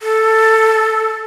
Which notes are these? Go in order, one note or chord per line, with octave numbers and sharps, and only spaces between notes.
A4